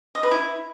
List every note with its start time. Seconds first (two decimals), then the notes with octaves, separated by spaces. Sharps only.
0.15 D#5
0.23 B4
0.31 E4